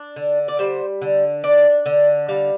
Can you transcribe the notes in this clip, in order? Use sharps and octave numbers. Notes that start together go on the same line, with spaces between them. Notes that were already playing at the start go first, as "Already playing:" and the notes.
Already playing: D4
D3
D5
G3 C5
D3
D4 D5
D3
G3 F5